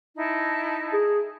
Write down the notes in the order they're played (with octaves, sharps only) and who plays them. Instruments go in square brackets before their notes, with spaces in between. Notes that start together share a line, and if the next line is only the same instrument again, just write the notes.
[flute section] D#4 E4 A5
[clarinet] G#4